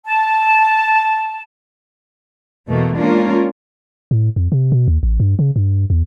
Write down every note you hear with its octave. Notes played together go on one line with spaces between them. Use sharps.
A5
E2 B2 A3 A#3
G#3 A#3 C#4 D4 F4 A#4
A2
F2
C3
B2
D#2
A1
G2
C#3
G2
E2